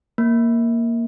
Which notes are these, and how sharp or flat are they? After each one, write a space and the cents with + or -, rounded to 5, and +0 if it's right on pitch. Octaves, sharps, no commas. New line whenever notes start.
A#3 +0